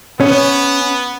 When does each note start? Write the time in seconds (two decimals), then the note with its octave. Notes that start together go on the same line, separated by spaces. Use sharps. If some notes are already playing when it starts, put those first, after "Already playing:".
0.21 B3 C#4